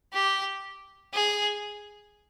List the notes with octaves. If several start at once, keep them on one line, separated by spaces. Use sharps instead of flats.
G4
G#4